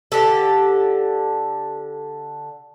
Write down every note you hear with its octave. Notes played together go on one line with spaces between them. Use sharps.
D3 G4 A4